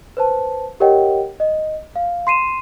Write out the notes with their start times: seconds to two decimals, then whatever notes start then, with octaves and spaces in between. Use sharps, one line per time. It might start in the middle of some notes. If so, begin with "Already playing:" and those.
0.17 B4 C5 A5
0.80 G4 A#4 C#5 D#5 F#5 G5
1.40 D#5
1.96 F5
2.27 C6 C7 D#7 E7